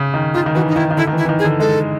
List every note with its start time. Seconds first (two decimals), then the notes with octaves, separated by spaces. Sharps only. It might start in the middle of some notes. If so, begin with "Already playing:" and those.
Already playing: C#3
0.14 D#3
0.34 D#3 F4
0.46 D#3
0.55 E3 F#4
0.68 D#4
0.76 D#3 E4
0.91 D#3
0.97 D3 E4
1.07 D#3
1.13 E3
1.18 E4
1.25 E3
1.29 D#3
1.39 G#4
1.44 D3
1.60 G#3 A4